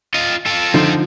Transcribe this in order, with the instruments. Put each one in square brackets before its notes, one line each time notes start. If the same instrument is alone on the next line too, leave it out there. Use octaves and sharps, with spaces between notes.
[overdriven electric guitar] F4 D#5
F4 A4
[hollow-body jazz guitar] D3 F3 D#4